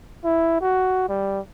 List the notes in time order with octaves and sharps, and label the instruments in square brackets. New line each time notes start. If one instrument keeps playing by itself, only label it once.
[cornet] E4
F#4
G3